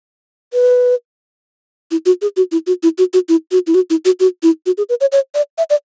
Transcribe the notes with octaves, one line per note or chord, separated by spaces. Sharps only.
B4
E4
F#4
G#4
F#4
E4
F#4
E4
F#4
F#4
E4
F#4
E4
F#4
E4
F#4
F#4
E4
F#4
G#4
B4
C#5
C#5
D5
E5
D5